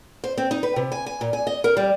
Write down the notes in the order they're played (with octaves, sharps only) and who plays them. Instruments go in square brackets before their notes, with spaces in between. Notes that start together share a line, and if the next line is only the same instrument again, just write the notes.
[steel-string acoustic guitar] C5
C4
D#4
B4
C3
G#5
G#5
A#2
G#5
D#5
A#4
G3